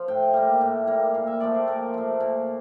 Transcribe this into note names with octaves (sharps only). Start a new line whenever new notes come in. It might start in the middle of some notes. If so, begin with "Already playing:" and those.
Already playing: F3
A2 G5
G3 A#3
A2
G3 A#3
A#2 F5
E5
F3 A3 D5
C5
A#2 A#4
F3 A3
A#2